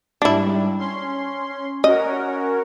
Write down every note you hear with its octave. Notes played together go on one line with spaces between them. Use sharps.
G#2 G3 D4 E4
C#4 C6
C#4 F#4 A#4 D#5